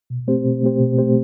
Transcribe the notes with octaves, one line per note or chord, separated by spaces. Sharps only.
B2
A3 C4 G4 C5
B2
A3 C4 G4 C5
B2
A3 C4 G4 C5